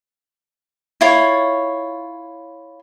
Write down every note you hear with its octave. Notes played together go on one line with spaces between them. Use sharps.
E4 F4 C#5